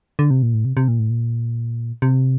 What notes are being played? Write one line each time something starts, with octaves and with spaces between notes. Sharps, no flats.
D3
C3
A#2
A2
C3
C3
A#2
A2
A#2
C3